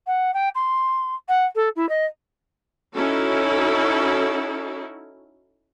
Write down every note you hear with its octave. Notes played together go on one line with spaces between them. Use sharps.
F#5
G5
C6
F#5
A4
E4
D#5
C#4 D#4 E4 F#4 A4